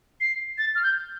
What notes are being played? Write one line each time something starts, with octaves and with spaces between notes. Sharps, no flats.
C7
A6
F6
G6